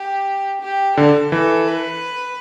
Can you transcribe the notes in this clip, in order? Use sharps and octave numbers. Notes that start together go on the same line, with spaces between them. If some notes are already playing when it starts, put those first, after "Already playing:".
Already playing: G4
G4
D3 A4
E3 A4
B4